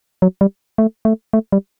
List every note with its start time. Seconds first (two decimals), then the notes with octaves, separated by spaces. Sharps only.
0.22 F#3
0.41 G3
0.78 A3
1.05 A3
1.33 A3
1.52 G3